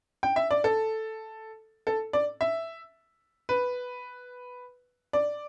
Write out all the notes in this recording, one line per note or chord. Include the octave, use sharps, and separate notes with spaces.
G5
E5
D5
A4
A4
D5
E5
B4
D5